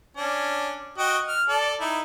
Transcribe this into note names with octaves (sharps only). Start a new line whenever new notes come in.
C#4 D4
F#4 D#5 G5
F6
A4 D5
D#4 E4